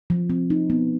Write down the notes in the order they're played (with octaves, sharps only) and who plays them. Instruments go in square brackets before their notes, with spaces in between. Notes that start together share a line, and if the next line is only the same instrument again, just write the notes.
[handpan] F3
C4
D#4
B3